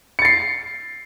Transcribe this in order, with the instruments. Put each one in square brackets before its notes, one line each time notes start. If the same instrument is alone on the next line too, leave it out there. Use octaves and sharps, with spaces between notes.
[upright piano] C#7
A6
C7